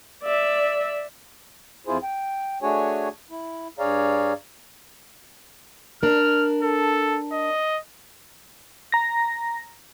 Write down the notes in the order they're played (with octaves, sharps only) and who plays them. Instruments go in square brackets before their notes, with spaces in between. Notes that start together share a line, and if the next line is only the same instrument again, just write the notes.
[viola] D5 E5
[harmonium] F2 E4 F4 G#4 C5
G5
A3 D4 F#4 G#4 C#5 G#5
E4
G2 G#4 C#5 D5 F5 A#5
[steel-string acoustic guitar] D4 A#4 [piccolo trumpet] F6
[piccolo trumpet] A4
D#5
[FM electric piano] A#5 A#6